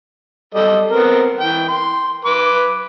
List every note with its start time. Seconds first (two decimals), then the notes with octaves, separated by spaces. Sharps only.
0.55 G3 A4 D#5
0.91 B3 C4 A#4
1.40 E3 G5
1.69 C6
2.25 B4 D6